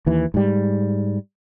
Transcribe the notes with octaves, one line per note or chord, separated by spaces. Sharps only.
D#2 E3
G#2 G3